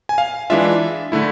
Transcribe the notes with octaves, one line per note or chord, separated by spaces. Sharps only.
G#5
F5
E3 G#3 D4 F4 E5
D3 A3 E4